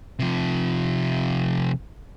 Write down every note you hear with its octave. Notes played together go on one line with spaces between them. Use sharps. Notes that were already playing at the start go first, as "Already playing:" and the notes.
C3 F3